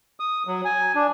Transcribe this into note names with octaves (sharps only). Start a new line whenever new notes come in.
D#6
F#3
G#5
D4